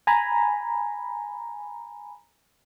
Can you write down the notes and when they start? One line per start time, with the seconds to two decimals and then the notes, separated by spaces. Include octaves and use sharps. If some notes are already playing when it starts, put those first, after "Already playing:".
0.07 G#5 A#5 B5